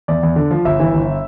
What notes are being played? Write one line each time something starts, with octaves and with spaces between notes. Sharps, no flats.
E2 D5
E2
D3
F3
G1 E5
E3
G1